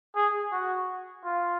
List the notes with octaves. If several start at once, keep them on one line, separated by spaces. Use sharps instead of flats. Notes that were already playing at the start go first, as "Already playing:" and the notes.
G#4
F#4
F4